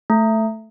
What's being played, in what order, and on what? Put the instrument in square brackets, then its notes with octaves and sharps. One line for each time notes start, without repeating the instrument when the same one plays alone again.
[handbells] A3